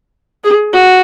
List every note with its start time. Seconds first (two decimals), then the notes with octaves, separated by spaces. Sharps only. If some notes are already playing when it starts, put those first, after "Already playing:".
0.44 G#4
0.73 F#4